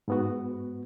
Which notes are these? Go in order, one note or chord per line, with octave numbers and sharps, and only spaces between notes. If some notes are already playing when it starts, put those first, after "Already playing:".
G#2 B3 F#4